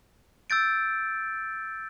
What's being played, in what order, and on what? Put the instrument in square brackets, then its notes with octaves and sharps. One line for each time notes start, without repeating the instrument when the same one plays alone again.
[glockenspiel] E6 G6 A6 D7